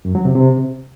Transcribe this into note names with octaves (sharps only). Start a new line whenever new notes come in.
F#2
F#3
C3
C3